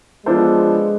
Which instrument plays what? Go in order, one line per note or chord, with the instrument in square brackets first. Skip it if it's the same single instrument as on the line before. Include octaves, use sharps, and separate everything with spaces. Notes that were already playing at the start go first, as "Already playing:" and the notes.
[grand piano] F3 B3 D4 A4 C5 [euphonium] G#3